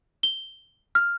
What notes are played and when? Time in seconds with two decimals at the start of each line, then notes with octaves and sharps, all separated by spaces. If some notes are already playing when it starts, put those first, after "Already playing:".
0.23 G7
0.95 F6